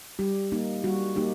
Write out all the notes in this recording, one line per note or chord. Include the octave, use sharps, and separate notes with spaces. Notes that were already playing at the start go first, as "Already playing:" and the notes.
G3 G4
A#3 D#4
G3 F#4
A#3 D#4 G4